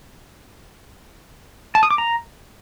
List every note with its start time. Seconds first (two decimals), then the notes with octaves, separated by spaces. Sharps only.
1.75 A5
1.83 D#6
1.91 D6
1.98 A#5